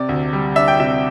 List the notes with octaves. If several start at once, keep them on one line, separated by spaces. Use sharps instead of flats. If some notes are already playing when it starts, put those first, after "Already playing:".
Already playing: C3 D5
D2
G3
D4 E5
G5
C3 E5